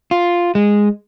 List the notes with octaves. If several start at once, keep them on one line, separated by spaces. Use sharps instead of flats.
F4
G#3